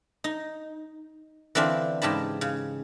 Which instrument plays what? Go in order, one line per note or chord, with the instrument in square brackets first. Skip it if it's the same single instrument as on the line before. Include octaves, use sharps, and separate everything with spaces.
[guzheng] D#4
D3 E3 C4 D4 F4
G#2 C#3 G4 A5 B5
C#3